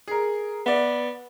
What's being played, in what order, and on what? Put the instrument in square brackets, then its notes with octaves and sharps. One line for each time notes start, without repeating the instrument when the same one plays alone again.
[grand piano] G#4 A#4
[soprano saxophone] B3 [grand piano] D5 E5